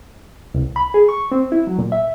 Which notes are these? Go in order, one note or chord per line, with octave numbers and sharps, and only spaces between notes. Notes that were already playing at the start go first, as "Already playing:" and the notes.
C2
B5
G#4
C#6
C4
E4
F#3
A#2
E5